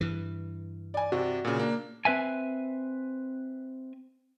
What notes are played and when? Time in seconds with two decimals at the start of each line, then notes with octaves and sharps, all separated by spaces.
0.01 G2 E3
0.94 D5 G#5
1.12 C3 F#4 D5
1.45 A#2 C#3
1.60 A#3 D4
2.05 C4 B4 E5 G#5